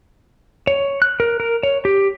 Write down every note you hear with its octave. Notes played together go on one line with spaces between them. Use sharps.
C#5
F#6
A#4
A#4
C#5
G4